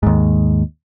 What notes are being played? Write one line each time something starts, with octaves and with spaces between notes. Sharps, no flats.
D#2 G#2